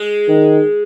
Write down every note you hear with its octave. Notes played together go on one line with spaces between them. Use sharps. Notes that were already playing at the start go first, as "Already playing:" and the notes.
Already playing: G#3
D#3